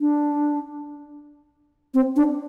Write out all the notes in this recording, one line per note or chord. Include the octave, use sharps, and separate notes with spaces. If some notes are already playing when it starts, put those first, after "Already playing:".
D4
C4
D4